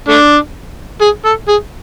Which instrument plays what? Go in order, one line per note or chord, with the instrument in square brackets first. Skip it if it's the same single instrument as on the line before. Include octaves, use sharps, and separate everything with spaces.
[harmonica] A3 D4
G#4
A4
G#4